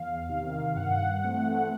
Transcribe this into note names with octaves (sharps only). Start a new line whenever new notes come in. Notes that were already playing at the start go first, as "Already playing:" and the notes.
Already playing: E2 F5
C3 D#3
G2 F#5
E3 A3 C4